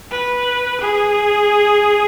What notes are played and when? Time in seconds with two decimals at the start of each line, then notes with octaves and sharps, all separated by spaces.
0.11 B4
0.80 G#4